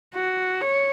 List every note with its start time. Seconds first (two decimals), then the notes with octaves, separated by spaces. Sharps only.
0.15 F#4
0.61 C#5